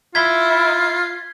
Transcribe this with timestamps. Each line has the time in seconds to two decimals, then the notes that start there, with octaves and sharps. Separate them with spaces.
0.15 E4 F4 G#6 B6 G7